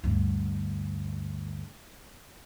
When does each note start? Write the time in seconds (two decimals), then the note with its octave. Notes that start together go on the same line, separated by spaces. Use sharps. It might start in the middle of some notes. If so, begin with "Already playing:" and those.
0.04 D2 G2